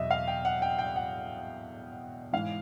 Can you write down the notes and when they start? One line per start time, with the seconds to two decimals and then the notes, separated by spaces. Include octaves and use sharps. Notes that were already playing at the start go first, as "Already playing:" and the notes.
Already playing: E2 B2 F#3 D#5 E5
0.11 F5
0.28 G5
0.45 F#5
0.62 G5
0.79 G5
0.96 F#5
2.33 G#2 E3 F5